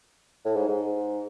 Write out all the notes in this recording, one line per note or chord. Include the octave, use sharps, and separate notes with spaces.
A2
G#2
G#2